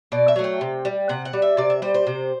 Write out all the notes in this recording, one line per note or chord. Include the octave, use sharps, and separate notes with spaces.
B2 D5
E5
F#3 A3
G5
C3
G3
C3 F#5
F#5
G3
E5
C3 D5
E5
G3 C5
C5
C3